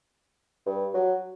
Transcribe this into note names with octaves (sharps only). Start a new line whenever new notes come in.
G2
F#3